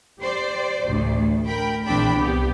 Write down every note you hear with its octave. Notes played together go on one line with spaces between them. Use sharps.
G4 C5 D5
A1 D2
A#4 G5 B5
A#1 E2 C4 D4 G5 B5
C2 B3 G4